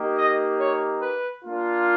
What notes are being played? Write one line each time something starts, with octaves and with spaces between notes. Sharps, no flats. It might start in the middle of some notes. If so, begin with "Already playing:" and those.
Already playing: A#3 D#4 G4
D#5
C#5
B4
A#3 D4 F4